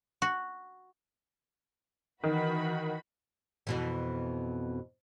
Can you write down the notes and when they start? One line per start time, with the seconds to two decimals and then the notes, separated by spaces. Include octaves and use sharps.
0.22 F#4
2.24 D#3 E3 F#4 B5
3.67 F2 B2 E3